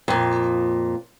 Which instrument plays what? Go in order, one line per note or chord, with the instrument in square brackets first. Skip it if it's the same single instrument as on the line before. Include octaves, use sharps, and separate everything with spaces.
[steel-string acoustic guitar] F2 A#2